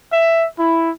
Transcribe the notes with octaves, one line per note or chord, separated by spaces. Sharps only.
E5
E4